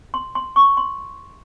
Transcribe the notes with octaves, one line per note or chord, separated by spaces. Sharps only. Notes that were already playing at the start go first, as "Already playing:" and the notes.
C6
C6
C#6
C6